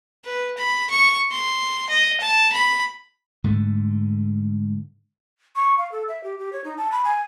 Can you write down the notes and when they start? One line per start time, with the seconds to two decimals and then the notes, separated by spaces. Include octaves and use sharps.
0.25 B4
0.57 B5
0.90 C#6
1.31 C6
1.89 D#5
2.20 A5
2.52 B5
3.44 G#2 D3 A3
5.56 C#6
5.78 F5
5.92 A4
6.08 E5
6.24 G4
6.38 G4
6.53 C#5
6.64 D#4
6.77 A5
6.92 B5
7.04 G#5